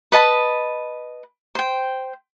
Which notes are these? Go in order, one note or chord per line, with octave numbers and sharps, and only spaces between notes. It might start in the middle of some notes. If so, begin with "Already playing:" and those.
B4 D#5 A5 B5
C5 G5